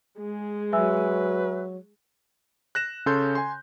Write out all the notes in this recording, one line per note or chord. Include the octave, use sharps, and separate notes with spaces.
G#3 G#4
F#3 B4 E5 G#5 E6
F#6 A#6 E7
C#3 C#4 A4 C#5 C6 G6
G#5 C6